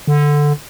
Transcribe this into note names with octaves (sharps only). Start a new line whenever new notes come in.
D3